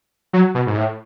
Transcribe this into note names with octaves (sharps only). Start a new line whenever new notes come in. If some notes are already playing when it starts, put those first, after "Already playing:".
F#3
B2
G#2
A2